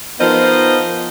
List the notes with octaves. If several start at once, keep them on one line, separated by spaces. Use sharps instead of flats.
F3 B3 D#4 A#4 C5 D#5